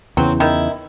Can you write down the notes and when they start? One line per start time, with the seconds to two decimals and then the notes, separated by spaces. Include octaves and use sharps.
0.17 E2 C#3 E3 F#3 C4
0.40 D#3 E4